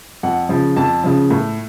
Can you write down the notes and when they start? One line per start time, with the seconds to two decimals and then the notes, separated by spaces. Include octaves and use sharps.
0.23 F2 F#5
0.49 C#3 F3
0.76 F2 A5
1.04 C#3 F3
1.30 A2